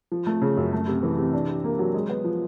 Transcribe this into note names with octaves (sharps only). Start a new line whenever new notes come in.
F3
A3
C#3
F#2
A3
C3
E3
C3
D4
G4
A#3
F#3
G#3
B3
F3